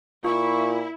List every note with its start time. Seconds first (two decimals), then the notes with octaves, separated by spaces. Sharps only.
0.24 A#2 E4 F4 C#6